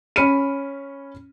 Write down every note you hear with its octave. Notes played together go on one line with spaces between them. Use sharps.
C#4 B5 F6 C#7 D#7